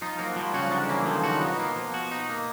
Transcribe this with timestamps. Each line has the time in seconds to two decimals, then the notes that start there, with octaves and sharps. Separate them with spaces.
0.01 F3 D#4 F4
0.19 F#3 A#3 F#4
0.36 F3 G3 G4
0.53 C#3 C#4 F#4
0.71 D3 D4 D#4
0.89 E3 A#3 E4
1.06 D#3 F3 D#4
1.24 D#3 D#4 F#4
1.41 B2 B3 D#4
1.59 A#3
1.76 F3
1.94 F#4
2.11 D#4
2.30 A#3